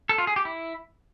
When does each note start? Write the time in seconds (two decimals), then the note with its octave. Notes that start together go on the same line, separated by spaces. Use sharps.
0.09 A4
0.18 F4
0.27 G#4
0.36 G4
0.45 E4